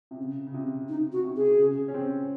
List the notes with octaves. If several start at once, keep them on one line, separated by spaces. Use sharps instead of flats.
C3
C#3
C#3
C3
D#4
F#4
C3
G#4
C#3
C#4
C4